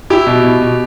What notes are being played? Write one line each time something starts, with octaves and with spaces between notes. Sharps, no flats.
E4 G4
B2
B2
B2